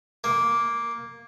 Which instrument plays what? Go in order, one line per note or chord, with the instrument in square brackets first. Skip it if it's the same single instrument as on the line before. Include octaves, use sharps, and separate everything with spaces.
[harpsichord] A#3